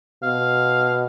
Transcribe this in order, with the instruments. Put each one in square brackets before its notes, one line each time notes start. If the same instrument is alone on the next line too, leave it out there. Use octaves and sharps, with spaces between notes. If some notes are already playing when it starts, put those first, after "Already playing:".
[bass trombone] B2 [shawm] F5